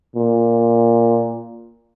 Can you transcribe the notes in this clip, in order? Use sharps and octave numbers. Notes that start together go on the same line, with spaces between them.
A#2